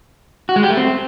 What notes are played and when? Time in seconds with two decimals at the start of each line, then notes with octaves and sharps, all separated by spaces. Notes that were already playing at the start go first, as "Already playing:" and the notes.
0.49 F#4
0.56 G#3
0.63 G4
0.70 A3
0.77 C4